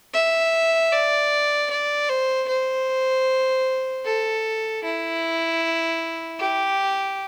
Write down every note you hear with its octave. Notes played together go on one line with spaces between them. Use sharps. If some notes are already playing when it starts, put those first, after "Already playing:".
E5
D5
D5
C5
C5
A4
E4
G4